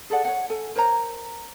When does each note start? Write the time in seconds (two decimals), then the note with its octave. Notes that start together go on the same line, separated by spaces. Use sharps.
0.10 G#4 A4 D5 F#5
0.25 C#5 F#5
0.50 A4 G#5
0.76 A#4 C5 C#5 A#5